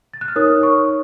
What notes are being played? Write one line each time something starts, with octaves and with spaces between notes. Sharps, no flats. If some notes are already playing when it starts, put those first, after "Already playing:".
A6
F#6
F6
D#4 A#4 C#5 D#6
C#6